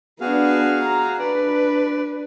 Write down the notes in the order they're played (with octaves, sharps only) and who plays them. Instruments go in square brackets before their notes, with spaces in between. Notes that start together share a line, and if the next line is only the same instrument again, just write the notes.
[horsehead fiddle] B3 D4 [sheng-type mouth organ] F#4 G#4 F5
[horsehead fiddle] A#5
[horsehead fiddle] D4 B4 [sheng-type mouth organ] D5